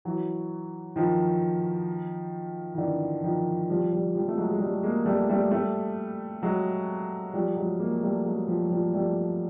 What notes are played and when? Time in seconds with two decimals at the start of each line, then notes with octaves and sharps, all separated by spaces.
0.05 E3 F#3
0.96 D#3 F3
2.75 D#3
2.78 D3 E3
3.24 D#3 F3
3.69 F3 G3
3.92 F3 G3
4.15 F3 G3
4.28 A3
4.37 F#3 G#3
4.51 G#3
4.60 G3 A3
4.83 G#3 A#3
5.06 G3 A3
5.29 G3 A3
5.51 G3 A3
6.43 F#3 G#3
7.34 F3 G3
7.56 F#3 G#3
7.79 G#3 A#3
8.03 G3 A3
8.25 F#3 G#3
8.48 F3 G3
8.70 F3 G3
8.93 G3 A3